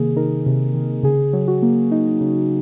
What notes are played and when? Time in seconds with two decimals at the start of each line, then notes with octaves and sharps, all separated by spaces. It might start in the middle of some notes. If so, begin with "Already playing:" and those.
Already playing: C3 D#3 A#3 G#4
0.16 D#4 A#4
0.46 C3
0.74 D#3
1.03 C#3 G#4
1.33 F#3
1.48 F#4
1.62 A#3
1.91 D#4
2.21 C#3